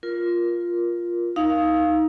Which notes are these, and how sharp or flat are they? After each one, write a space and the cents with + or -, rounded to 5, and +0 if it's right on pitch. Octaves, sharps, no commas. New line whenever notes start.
F4 +0 A#4 +20
D#4 +15 F5 +0